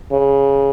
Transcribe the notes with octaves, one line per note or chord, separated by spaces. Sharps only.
C#3